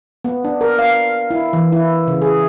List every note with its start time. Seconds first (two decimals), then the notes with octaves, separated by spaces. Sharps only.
0.25 B3
0.44 D4
0.61 A#4
0.79 F5
1.30 E4
1.53 E3
1.72 E4
2.07 C#3
2.22 G#4